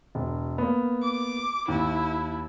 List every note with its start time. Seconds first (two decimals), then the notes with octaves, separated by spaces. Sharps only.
0.15 E1
0.58 A#3 B3
1.02 D6
1.68 D#2 E4